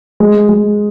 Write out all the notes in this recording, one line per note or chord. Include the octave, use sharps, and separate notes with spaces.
G#3
G#3